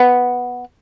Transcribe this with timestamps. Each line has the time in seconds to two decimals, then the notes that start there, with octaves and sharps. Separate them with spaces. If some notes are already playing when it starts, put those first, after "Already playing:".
Already playing: B3